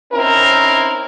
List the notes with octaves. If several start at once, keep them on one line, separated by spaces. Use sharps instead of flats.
C4 C#4 D#4 E4 A#4